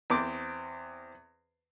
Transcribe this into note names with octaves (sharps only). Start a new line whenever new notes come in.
E2 C4 C5 D6